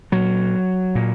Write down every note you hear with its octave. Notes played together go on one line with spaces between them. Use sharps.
A#2 F#3
A#2